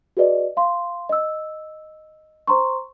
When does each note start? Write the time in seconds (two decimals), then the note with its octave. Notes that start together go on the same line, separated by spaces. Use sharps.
0.17 F#4 G#4 B4 D5 D#5
0.57 F5 C6
1.09 D#5 E6
2.47 C5 A#5 C6 C#6